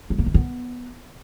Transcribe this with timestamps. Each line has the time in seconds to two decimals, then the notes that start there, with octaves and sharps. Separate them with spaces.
0.10 G3
0.18 A#3
0.26 D#3
0.34 B3